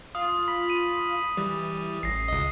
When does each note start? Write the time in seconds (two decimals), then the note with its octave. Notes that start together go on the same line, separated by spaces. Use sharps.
0.15 F4 D#6
0.48 B5
0.70 D#7
1.37 E3 G3
2.03 A1 A#6 C7
2.28 C#2 D#5